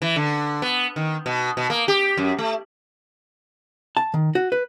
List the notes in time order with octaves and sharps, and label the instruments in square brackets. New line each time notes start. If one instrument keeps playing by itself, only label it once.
[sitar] E3
D3
B3
D#3
B2
B2
A#3
G4
F#2
A3
[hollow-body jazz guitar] A5
D#3
F#4
B4